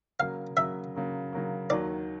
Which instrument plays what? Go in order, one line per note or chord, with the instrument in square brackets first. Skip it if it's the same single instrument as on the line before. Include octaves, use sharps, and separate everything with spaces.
[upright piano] C#3 F#3 A#3 [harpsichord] F5
[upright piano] C#3 F#3 A#3 [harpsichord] E5
[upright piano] C#3 F#3 A#3
C#3 F#3 A#3
[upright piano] D#2 D#3 F#3 [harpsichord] D5